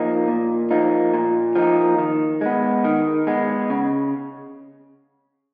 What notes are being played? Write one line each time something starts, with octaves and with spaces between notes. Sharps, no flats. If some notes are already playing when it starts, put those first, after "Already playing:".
Already playing: F3 A#3 D#4
A#2
F3 A#3 D#4
A#2
F3 A#3 D#4
D#3
G#3 B3
D#3
G#3 B3
C#3